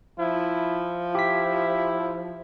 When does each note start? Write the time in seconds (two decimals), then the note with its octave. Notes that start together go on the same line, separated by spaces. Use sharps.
0.19 F3 E4
1.15 E4 G4 B6